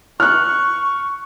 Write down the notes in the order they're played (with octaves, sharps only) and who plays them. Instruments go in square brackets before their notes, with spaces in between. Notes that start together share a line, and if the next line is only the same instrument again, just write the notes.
[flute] C#6 [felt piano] F6 F#6